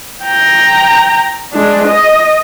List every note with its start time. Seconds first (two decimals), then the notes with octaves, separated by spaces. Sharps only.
0.24 G5 A#5
1.53 G#3 D4
1.87 D#5